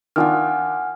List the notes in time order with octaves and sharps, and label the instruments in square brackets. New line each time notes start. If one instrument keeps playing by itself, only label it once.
[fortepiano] D#3 D4 F4 [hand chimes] F#5 G#5 F6